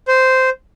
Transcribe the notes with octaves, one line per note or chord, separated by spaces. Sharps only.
C5